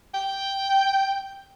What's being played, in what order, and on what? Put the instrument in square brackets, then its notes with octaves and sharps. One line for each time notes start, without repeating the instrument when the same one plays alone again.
[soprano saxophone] G5